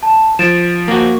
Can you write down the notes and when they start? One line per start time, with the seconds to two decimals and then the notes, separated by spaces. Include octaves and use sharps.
0.03 A5
0.39 F3 A6 D7 E7
0.88 A#3 F#4